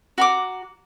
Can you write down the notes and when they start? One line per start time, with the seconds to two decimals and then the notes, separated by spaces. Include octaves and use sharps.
0.18 F#4 A#5 D6